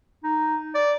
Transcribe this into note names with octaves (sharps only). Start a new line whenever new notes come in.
D#4
D5